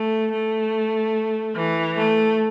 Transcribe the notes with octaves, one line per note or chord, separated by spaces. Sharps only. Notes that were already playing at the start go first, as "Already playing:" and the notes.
Already playing: A3
A3
E3
A3